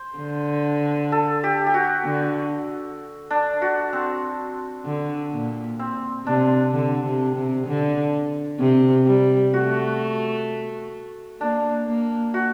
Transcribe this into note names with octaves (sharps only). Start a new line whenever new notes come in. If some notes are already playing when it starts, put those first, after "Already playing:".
Already playing: C5
D3
A4
G4
G4
F#4
D3
D4
F#4
C4
D3
A#2
C4
C3 D4
D3
C3
C3
D3
C3
G3
A3 F#4
A#3 D4
A#3
F#4